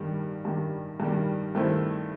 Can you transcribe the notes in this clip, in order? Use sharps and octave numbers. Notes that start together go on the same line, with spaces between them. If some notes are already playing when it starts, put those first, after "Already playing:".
Already playing: G2 D#3 G3
G2 D#3 G3
G2 D#3 G3
G2 D#3 A3 C4 E4